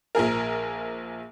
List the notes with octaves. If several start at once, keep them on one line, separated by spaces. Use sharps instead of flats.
A#1 F3 G#4 A#4